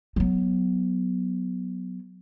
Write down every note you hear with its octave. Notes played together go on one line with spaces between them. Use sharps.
F#3 B3